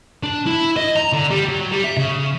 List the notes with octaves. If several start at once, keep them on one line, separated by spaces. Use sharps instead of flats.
D4
E4
D#5
A#5
D3
G3
F#3
G3
E5
C#3